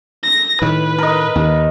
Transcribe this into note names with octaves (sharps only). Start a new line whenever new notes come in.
A#6
A2 D#3 B4
A#4 D#5
D#2